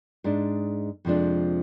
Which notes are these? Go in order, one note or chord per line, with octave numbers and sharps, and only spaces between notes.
G#2 G#3 D4
F2 C3 F3 G#3 D4